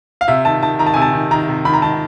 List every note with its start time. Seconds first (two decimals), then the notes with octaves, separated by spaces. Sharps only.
0.21 F5
0.28 C3 E5
0.45 D#3 A5
0.63 D#3 A5
0.79 D#3 A#5
0.86 A5
0.94 C3 G#5
1.02 A5
1.13 D#3
1.31 D#3 A#5
1.48 C3
1.65 D#3 B5
1.74 A#5
1.82 D#3 A5